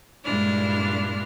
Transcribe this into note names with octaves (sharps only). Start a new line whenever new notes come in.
G2 A#2 G#3 D4 E4 F6